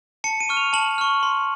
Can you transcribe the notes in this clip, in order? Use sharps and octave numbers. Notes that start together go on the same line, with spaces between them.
A5 C#7
D#7
C#6 F6
F7
A5 F#7
C#6 F6
C6